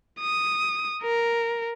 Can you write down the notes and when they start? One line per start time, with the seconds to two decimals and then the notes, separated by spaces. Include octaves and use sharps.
0.19 D#6
1.03 A#4